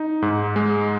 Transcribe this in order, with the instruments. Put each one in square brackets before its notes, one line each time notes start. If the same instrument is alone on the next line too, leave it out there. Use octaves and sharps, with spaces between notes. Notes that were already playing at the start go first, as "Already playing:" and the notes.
Already playing: [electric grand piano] D#4
G#2
G#3